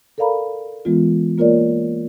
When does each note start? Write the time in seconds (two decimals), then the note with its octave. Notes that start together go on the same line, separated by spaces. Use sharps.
0.18 A4 A#4 D5 F5 A#5 B5
0.85 E3 G#3 B3 F4
1.38 A#3 F4 A#4 C#5 D5